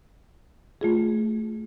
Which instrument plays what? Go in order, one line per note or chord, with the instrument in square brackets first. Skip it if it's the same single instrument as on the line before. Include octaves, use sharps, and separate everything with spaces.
[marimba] A3 F4 G#4